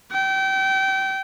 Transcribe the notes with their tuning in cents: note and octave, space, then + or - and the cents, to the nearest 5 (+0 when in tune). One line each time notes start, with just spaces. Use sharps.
G5 -30